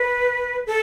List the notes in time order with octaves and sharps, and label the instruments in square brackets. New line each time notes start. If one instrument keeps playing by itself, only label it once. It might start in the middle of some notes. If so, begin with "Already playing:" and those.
Already playing: [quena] B4
A4